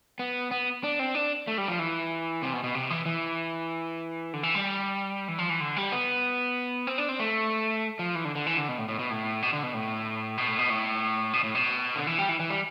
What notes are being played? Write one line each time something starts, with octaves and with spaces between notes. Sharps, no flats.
B3
B3
D4
C4
D4
A3
G3
F3
E3
C3
B2
B2
C3
E3
E3
D3
E3
G3
E3
F3
E3
D3
G3
B3
C4
D4
C4
A3
F3
E3
D3
D3
E3
D3
B2
A2
A2
B2
A2
B2
D3
B2
A2
B2
A2
B2
A2
B2
A2
B2
D3
E3
G3
E3
E3
G3